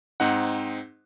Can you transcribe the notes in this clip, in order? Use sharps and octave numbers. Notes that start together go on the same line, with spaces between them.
G#2 C4 D#4 F#5